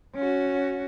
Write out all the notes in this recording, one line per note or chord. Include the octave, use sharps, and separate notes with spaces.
C#4 F#4